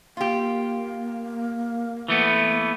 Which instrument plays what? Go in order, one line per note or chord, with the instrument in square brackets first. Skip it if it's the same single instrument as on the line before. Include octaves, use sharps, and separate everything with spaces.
[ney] A#3 [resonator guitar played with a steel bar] F4 G4
[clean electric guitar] E3 A3 B3